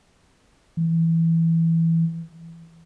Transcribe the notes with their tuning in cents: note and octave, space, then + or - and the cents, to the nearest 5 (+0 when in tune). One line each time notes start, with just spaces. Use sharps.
E3 +0